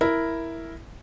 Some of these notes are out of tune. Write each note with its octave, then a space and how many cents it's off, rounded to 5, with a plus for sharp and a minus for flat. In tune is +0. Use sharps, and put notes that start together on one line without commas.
E4 +0 A#4 +0